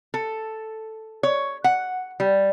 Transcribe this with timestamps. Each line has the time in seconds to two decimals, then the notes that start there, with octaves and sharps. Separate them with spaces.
0.14 A4
1.23 C#5
1.64 F#5
2.20 G3